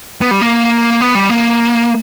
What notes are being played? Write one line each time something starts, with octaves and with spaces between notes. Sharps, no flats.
B3
G3
A#3
B3
G3
A#3